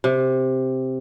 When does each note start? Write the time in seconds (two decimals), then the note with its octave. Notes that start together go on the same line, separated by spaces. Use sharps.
0.04 C3